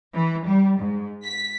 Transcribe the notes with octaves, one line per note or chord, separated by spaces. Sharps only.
E3
G3
G#2
B6